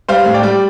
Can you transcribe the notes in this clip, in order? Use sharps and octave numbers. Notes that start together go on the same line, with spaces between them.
G3 C5 F5
A2
D5 G5
G3